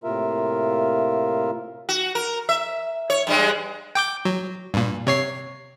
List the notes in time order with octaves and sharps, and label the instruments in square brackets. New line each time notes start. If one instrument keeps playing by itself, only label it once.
[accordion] A2 C3 A#3 F4 A#4 E5
[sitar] F#4
A#4
E5
C#5
G2 G3 G#3
[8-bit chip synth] G5 D6 G6
F#3
G2 A#2
C3 C#5 C7